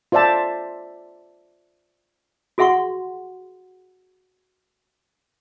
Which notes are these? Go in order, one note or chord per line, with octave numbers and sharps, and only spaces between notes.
F4 C5 D5 E5 A5
F#4 G#4 E5 F#5 C6 C#6